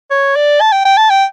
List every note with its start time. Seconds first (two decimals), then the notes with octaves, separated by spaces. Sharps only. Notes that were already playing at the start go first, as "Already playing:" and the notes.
0.11 C#5
0.36 D5
0.61 A5
0.72 G5
0.85 G5
0.97 A5
1.10 G5